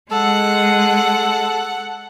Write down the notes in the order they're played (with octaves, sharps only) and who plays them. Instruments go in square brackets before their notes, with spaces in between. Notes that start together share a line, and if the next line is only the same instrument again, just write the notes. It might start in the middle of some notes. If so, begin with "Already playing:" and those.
[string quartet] G#3 [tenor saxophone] A4 [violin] F#5